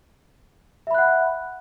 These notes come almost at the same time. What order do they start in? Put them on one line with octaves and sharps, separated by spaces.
E5 B5 F#6 F#5